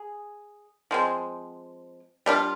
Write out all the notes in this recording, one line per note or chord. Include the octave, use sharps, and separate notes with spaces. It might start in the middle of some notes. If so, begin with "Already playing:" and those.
Already playing: G#4
F3 G#3 C4
G3 D4 F4